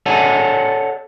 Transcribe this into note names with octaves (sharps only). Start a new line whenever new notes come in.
A4 C#5 D5 F#5 G#5 A5